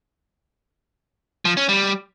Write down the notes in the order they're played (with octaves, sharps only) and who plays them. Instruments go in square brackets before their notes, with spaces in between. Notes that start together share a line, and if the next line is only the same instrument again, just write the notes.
[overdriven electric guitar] F3
C#4
G3